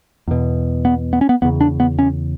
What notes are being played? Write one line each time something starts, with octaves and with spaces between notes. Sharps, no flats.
E2 B2
B3
B3
C#4
B3
E2 C#3 B3
D4
B3
C#4